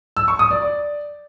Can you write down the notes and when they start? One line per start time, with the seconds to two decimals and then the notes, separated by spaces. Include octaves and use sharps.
0.17 E6
0.28 C#6
0.39 D#6
0.51 D5
0.62 D5